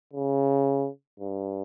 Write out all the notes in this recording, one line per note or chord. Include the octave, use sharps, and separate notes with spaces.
C#3
G2